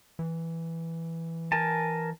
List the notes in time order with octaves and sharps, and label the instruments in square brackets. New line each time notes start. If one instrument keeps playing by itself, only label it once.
[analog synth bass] E3
[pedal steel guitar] A#4 G#5 A5